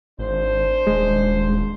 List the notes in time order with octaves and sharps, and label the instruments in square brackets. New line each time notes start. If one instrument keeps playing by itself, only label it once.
[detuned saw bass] G#1 [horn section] D4 C5
[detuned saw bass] D#1 [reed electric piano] G#3